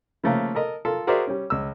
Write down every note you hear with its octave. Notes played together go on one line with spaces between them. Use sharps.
C#3 F3 A3 A#3
A4 A#4 D#5
F4 A4 A#4
F#4 G#4 A#4 C5 D5 E5
G3 C#4
C#2 E6